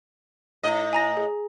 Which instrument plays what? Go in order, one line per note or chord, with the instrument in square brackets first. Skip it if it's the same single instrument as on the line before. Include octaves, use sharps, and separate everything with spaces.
[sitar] A2 D#5
[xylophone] G#5 A#5 A#6
G#4